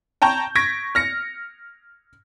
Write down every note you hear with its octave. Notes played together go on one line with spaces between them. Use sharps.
G5 A5 A#5 C#6 G6
C#6 G#6 A#6 B6 D7
F6 A#6 C#7